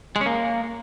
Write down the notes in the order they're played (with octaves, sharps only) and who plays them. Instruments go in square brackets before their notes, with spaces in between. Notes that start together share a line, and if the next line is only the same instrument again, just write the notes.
[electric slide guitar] G#3
C#4
A#3